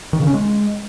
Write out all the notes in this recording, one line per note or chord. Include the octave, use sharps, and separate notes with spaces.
D#3
C#3
C#4
G#3